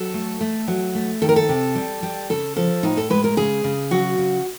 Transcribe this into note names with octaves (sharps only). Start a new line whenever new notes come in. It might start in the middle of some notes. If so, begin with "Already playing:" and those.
Already playing: F#3 A4
A3
A3
F#3
A3
D#3 A4
A#4
A4
C3
G3
G3
C#3 A4
F3 A4
A2 D#4
A4
G#3 B4
A#4
C#3 G#4
C#3
F#3 F#4
C#3